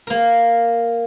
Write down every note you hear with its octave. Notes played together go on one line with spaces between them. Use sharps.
A#3 A#4